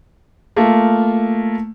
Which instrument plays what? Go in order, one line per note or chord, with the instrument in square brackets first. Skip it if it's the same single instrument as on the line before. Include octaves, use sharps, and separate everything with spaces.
[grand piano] A3 A#3 F4